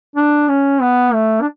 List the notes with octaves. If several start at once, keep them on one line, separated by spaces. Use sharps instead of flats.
D4
C#4
B3
A3
D4